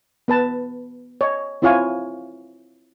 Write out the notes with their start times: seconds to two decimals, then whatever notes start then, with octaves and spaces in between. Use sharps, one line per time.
0.28 B3 B4 A5
1.21 C#5 D#5
1.62 C4 E4 F4 C#5 F5 G#5